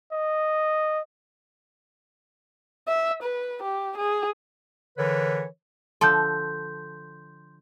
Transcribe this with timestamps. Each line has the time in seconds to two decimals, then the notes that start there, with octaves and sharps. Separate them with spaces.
0.12 D#5
2.88 E5
3.23 B4
3.62 G4
3.97 G#4
4.98 D3 E3 A#4 B4 C#5
6.01 D3 F3 A4 C6 G6